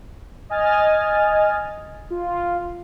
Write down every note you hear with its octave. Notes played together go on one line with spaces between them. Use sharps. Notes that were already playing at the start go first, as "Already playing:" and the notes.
D#5 G#5 F6 A6
F4